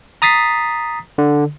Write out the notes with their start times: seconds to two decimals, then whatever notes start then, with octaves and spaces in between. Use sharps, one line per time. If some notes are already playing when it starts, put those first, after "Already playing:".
0.22 A#5 D#6 A6 B6 C7
1.18 D3